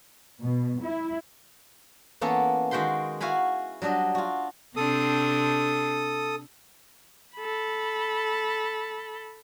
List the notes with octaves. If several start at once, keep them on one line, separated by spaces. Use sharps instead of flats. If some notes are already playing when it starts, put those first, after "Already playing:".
B2
E4
E3 A#3 B3 C#4 A4
D#3 G#3 F#4 G5 B5 C6
E4 F#4 F5 G#5 B5
F#3 G3 D4 D#5
F4 F#4
C3 C4 D4 A4 D#6
A4 B5